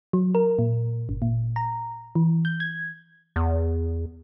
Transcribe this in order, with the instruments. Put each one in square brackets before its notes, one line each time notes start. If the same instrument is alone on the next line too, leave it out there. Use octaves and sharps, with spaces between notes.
[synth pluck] F#3
A#4
A#2
G1
A#2
A#5
E3
G6
G#6
[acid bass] E2